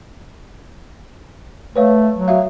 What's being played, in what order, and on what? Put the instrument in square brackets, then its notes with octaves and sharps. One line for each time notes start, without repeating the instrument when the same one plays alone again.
[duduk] A3 [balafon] B4 C#5 F5
[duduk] F#3
[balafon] F#4 E5 F5